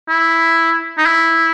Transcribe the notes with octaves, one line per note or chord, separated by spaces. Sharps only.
E4
D#4
E4